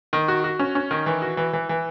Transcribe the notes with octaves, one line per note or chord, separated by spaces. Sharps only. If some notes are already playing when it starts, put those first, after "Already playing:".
D#3
F#4
F#4
C#4
C#4
D#3
E3
F#4
E3
E3
E3